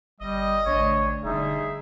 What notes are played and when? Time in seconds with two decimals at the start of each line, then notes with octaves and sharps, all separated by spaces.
0.20 G1 G3 D#5
0.66 A1 D2 D4 C#5
1.23 E1 D3 G3 D#4 G#4 E5